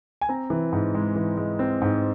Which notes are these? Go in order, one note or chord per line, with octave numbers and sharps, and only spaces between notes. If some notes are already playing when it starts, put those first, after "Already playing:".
G#5
C4 A#5
E3
G#2
G#3
E3
G#3
C4
G#2